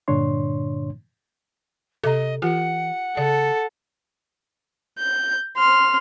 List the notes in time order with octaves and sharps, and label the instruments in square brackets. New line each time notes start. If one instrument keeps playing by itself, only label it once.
[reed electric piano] G2 A#2 D3 D4 C#5 C6
[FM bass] C3 [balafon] A4 A#5 [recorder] D#5
[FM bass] E3 [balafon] F4 G4 [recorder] F#5
[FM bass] C#3 [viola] A4 [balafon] D5
[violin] G6
C6 F6